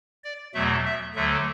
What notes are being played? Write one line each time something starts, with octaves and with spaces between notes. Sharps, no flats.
D5
E2 B2 F#3 A3 E5
E5
D2 D3 F#3 A3 E5